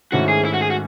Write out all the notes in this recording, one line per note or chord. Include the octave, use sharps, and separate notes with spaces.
G#2 D#3 A3 C#4 E4 F#4
G#4
E4
F#4
G#4
F#4